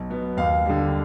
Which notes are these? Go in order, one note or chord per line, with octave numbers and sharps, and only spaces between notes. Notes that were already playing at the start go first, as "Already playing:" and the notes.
Already playing: B1
B2 B3
D#2 F5
D3 G3